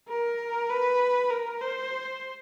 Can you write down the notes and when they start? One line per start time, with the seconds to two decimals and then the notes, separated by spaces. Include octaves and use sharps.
0.09 A#4
0.70 B4
1.30 A#4
1.61 C5